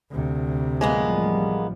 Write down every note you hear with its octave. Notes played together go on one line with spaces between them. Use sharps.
D2 C3
A1 F3 G3 G#3 A#3 B3